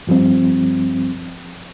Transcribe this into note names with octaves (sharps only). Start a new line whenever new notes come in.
G2 F3 G3 C4